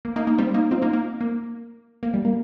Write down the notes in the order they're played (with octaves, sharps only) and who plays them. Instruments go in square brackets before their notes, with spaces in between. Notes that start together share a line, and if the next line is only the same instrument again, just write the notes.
[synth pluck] A#3
A#3 D#4
A#3 D#4
G3 C4
A#3 D#4
C4 F4
A#3 D#4
A#3
A#3
A#3
G3
A#3